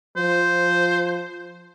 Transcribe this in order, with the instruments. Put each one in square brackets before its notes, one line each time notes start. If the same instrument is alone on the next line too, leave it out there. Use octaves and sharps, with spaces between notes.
[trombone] F3 [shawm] C5